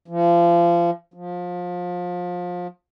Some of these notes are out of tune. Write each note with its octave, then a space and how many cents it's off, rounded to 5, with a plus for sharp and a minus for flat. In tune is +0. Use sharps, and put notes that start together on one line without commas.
F3 -30
F3 +25